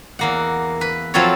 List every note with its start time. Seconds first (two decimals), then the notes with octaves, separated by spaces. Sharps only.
0.19 E2 A#3 F#5
0.81 B4
1.14 F3 F#3 C4 F4 A4 C#5